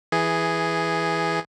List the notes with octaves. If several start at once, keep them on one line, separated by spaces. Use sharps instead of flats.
E3 G#4